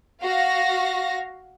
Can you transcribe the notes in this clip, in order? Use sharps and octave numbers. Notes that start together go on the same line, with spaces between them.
F#4 F5 A#6